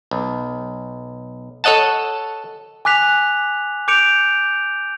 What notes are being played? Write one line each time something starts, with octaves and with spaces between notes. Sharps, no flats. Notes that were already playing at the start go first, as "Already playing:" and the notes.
B1
A4 C#5 D#5 F#5 A5
G#5 D6 F#6 B6 F7
D6 G6 C#7 D7 F7